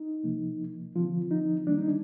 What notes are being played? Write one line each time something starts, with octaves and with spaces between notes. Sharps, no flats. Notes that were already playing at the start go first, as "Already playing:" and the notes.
Already playing: D#4
C3 F3 A#3
D3 F3 C4 F4
D#4
D#3 G3 A#3 D4
D#4
D4